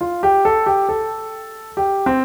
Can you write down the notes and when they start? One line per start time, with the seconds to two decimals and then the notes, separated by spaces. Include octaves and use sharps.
0.01 F4
0.23 G4
0.45 A4
0.66 G4
0.89 A4
1.77 G4
2.06 C4